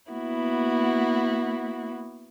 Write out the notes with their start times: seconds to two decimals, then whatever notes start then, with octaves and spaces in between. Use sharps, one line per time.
0.12 A#3 B3 E4 F#4